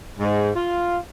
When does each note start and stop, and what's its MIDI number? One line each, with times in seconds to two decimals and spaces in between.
0.19 0.50 44
0.56 0.98 65